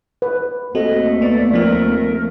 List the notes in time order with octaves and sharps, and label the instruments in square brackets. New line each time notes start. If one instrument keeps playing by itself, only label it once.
[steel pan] B4
[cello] D#2 A3 [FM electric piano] C4 [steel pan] F#4 A4 [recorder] D#5
[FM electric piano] B3 [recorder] D5
[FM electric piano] F3 C4 [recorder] A#4